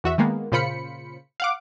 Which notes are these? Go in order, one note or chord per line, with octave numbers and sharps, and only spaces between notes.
E2 F#4 E5
D#3 G#3 A#3 B3
A#2 C#3 F4 C5 B5 C#7
F5 F#5 D6